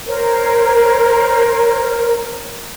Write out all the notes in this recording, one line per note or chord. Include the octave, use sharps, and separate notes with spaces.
A#4 C5 C#5